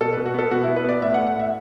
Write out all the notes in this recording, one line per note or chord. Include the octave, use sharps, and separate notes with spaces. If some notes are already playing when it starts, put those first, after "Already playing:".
B2 A4
B2 B4
F#4
B3 A4
B2 F#4
B3 E4
B4
B3 D5
A2 E5
F#5
A3
F#5
A2 E5